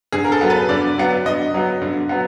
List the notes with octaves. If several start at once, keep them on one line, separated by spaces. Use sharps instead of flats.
D3 G#4
A#4
A4
F#3 B3
B4
D3 D5
F#3 B3
D3 D#5
F#3 B3
D3
F#3 B3